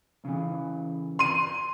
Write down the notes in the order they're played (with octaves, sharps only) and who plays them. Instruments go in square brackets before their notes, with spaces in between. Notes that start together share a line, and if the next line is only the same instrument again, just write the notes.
[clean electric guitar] C#3 E3
[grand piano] C6 D#7